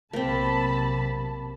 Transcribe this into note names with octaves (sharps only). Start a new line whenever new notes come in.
B1 C3 A#3 C4 A5 B5